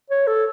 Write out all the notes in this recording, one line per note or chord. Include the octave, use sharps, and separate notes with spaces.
C#5
A4